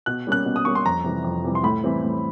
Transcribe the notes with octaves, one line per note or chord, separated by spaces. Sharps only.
B2 F#6
G3 A#3 C#4 F#6
B2
D#6
G3 A#3 C#4 C#6
C6
F2 A#5
C3 E3 G3
F2
C3 E3 G3
C6
A2 B5
E3 G3 C4
A2